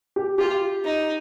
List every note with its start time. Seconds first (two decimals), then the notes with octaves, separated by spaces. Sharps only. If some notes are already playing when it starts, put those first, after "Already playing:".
0.16 G4
0.38 F4 G4
0.85 D#4